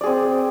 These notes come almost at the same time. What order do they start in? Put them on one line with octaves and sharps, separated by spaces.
D5 G#4 C4